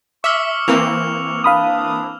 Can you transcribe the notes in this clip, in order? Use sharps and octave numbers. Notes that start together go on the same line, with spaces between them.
E5 C#6 D6 E6 F6
E3 A#3 C4 F7
D4 F5 B5 D#6